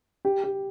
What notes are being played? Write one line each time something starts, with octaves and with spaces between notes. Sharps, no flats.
G4
G4